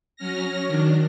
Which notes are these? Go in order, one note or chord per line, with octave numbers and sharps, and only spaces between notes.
F#3 C#4 F6 A#6
D#3 F#3 D4